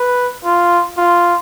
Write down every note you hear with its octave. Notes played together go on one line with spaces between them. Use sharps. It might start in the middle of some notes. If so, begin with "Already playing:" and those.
Already playing: B4
F4
F4